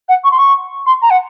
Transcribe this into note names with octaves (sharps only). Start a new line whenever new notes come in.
F#5
C#6
C6
C#6
C6
A#5
F#5